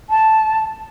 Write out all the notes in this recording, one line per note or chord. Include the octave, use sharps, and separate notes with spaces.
A5